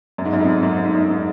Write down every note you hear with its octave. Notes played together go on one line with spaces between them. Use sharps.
F#2
G#2
F#2
F2
F#2
G#2
F#2
G#2